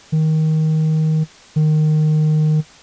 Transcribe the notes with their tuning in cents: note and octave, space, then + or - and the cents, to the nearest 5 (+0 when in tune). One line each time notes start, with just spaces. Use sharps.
D#3 +15
D#3 -15